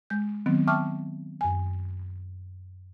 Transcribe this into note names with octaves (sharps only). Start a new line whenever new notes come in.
G#3 G6
D#3 F#3 B3 C4
E5 G5 A5 C#6 D6 F6
F#2 G#5